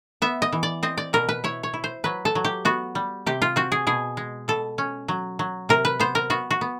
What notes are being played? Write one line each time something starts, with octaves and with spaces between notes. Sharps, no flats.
B3 E5
D#5
E3
D5
C4 D#5
D5
B2 A#4
B4
E4 C#5
C#5
E4
C5
F#3 B4
A4
F#3
G4
B3 F#4
G3
C3 G4
F4
C4 F#4
G#4
B2 G#4
G#3
B2 A4
C#4
F#3
F#3
C3 A#4
B4
B3 C5
A#4
B3 F#4
F#4
B3